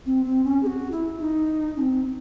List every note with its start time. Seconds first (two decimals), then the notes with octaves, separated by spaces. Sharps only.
0.06 C4
0.25 C4
0.44 C#4
0.63 G#4
0.66 F#4
0.91 E4
1.20 D#4
1.76 C#4
1.80 C4